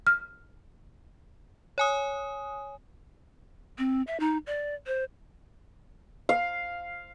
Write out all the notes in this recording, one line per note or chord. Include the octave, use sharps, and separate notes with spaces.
F6
C#5 G#5 D#6
C4
E5
D#4
D5
C5
F5